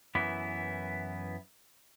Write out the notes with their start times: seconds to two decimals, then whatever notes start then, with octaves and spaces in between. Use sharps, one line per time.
0.15 F#2 E3 B3 E4